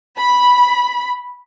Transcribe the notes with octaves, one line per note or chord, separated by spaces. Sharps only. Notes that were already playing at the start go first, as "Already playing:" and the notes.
B5